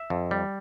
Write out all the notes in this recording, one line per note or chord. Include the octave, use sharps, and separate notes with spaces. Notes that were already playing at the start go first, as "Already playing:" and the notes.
Already playing: E5
F2
G3